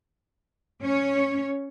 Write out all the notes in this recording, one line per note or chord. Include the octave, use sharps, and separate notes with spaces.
C#4 C#5